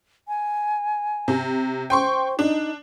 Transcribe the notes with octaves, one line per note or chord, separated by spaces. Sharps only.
G#5
C3
C5 G5 C6 C#6
D4 D#4